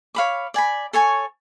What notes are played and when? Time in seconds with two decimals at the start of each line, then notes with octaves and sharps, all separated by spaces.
0.15 C#5 F5 B5 D6
0.54 D5 G#5 B5
0.93 A4 C#5 G#5 C#6